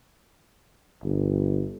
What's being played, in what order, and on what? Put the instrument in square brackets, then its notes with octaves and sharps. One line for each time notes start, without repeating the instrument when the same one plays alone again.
[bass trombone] G1